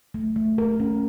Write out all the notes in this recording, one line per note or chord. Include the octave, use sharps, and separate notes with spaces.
A3
A3
A#4
C#4